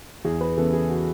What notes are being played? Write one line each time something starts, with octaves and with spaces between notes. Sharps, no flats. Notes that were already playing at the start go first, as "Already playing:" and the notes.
E2 G#4
B4
C#3 E3 B3 A4
G#4
F#4